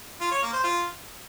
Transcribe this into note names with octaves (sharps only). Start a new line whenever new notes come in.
F4
C#5
A#3
C5
F4